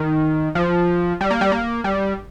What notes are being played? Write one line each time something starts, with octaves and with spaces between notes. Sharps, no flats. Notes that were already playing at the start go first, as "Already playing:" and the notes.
Already playing: D#3
F3
G3
A#3
G3
A#3
G3